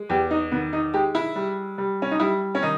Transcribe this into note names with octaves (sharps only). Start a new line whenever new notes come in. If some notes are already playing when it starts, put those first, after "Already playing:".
Already playing: G#3
E2 G4
D#4
D#3 B3
D#4
G#3 G4
E4
G3
G3
C#4
D#4
G3 E4
C#4
D#3 D#4